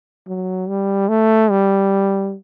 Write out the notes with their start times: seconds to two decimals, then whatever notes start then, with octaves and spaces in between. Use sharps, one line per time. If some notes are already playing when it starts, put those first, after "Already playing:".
0.28 F#3
0.69 G3
1.09 A3
1.51 G3